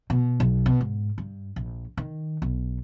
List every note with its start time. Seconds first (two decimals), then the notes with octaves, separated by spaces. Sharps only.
0.10 B2
0.40 B1
0.66 B2
0.81 G#2
1.18 G2
1.56 A#1
1.97 D#3
2.42 B1